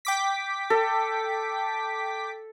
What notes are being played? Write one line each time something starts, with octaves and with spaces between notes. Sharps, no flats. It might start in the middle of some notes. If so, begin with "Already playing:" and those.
G5 D6 B6
A4